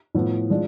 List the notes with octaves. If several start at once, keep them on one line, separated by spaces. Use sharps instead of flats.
A2 F3 B3
F3 G#3 D4